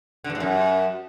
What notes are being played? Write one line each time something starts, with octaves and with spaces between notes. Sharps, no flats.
D3
G2
A2
F#2